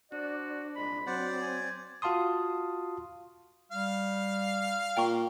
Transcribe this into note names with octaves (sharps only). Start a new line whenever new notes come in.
D4 F#4 C5 D5
C2 A#2 G#3 C5 B5
F#3 C4 C5 D5 F#5
G#5
F4 F#4 F5 A5 C6 D#6
G3 F5
A#2 G5 A#5 C#6